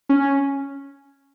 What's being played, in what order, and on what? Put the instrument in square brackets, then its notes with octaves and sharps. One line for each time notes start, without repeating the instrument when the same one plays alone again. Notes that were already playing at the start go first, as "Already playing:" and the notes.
[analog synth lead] C#4